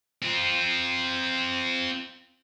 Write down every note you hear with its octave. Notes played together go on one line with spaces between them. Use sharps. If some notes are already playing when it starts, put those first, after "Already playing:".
C4 F4